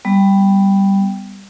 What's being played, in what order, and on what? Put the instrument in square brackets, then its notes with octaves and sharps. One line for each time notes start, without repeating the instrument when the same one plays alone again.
[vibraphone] G3 B3